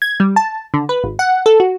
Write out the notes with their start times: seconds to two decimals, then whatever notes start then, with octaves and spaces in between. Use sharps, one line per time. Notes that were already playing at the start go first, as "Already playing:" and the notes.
0.02 G#6
0.20 G3
0.36 A5
0.74 D3
0.89 B4
1.04 G#1
1.19 F#5
1.46 A4
1.60 F#4